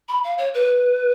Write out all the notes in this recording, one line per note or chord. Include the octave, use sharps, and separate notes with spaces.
B5
F5
C#5
B4